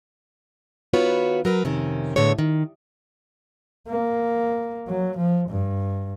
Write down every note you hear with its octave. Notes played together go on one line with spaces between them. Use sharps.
D#3 B3 F4 F#4 B4 C#5
F#3 A#4 B4
F2 C3 D#3 C#4
A2 D3 G#3 B3 C#5
D#3
A#3
F#3
F3
G2